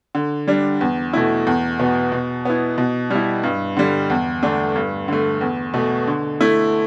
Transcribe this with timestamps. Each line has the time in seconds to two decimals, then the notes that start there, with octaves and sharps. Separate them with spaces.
0.15 D3
0.48 G3 D4
0.81 E2
1.13 B2 A3 E4
1.47 E2
1.79 B2 B3
2.12 B2
2.45 B3 E4
2.78 B2
3.10 G3 E4
3.43 G2
3.77 D3 G3
4.10 E2
4.43 D3 A3 D4
4.75 G2
5.08 D3 A3
5.41 E2
5.74 B2 A3
6.07 D3
6.40 A3 E4